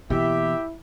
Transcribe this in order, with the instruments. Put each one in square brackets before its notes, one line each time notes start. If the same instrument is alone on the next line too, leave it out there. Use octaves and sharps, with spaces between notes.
[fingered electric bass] B2 E3 [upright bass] A#3 [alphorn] E4 [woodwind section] G4 E5